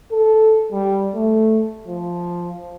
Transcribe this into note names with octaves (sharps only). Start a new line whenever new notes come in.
A4
G3
A3
F3